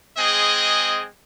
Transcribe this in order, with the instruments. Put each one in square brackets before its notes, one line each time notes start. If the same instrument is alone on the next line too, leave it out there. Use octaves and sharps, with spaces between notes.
[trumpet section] G#3 C4 G#4 D#5